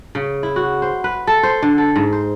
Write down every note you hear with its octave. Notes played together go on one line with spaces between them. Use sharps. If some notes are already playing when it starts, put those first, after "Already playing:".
C#3
E4
F#4
C5
B4
A4
C5
D3
A4
G#2
C5